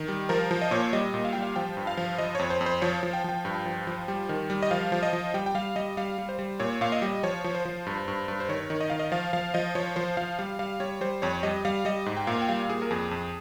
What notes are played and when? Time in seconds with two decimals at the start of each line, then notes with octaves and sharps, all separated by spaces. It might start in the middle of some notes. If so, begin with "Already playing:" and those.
Already playing: D#3
0.08 G3
0.29 F3 A#4
0.51 F3
0.62 D#5
0.71 A#2 C#5
0.93 G3 D#5
1.14 A#2
1.25 F5
1.33 G3 G5
1.43 F5
1.56 F3 G5
1.77 G2
1.87 F5
1.97 F3
2.18 F3 D#5
2.35 F2 C#5
2.50 C5
2.61 F2
2.66 C5
2.82 F3 C#5
3.03 F3
3.13 G5
3.24 F3 G5
3.45 G2
3.66 F3
3.87 F3
4.08 G3
4.29 D#3
4.50 G3
4.63 D#5
4.71 F3 F5
4.92 F3
5.03 D#5
5.13 F3
5.34 G3 G5
5.46 G5
5.55 G3 F5
5.76 G3 D#5
5.97 G3 F5
6.18 G3
6.29 C5
6.39 G3
6.60 A#2 C#5
6.81 A#2 F5
6.92 D#5
7.02 G3
7.23 F3 C#5
7.44 F3
7.55 C5
7.65 F3
7.86 G2
8.08 G2
8.28 G2
8.40 C5
8.49 D#3 C#5
8.70 D#3
8.81 D#5
8.90 D#3 F5
8.99 D#5
9.12 F3 F5
9.33 F3 F5
9.54 F3 D#5
9.75 F3 C#5
9.96 F3 C5
10.17 F3 F5
10.39 G3 F5
10.59 G3 F5
10.80 G3 C#5
11.01 G3 C5
11.22 F2 C#5
11.43 G3 D#5
11.65 G3 F5
11.85 G3 D#5
12.06 G#2
12.17 G5
12.27 A#2 F5
12.42 G5
12.49 G3 F5
12.69 A#2 G#4
12.82 A#4
12.91 F2 G#4
13.11 F2